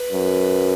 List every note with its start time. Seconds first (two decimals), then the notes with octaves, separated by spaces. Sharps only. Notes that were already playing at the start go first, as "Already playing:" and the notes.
Already playing: B4
0.12 F#2